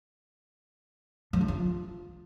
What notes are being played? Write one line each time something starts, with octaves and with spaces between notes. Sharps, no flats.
F3
D4
F4